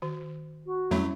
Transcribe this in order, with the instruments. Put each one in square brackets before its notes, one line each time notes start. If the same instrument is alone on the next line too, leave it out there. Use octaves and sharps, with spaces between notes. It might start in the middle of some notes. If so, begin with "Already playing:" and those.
[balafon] D#3 F#4
[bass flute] F#4
[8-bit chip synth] F2 F#3 A3 [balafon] G3 C#4 E4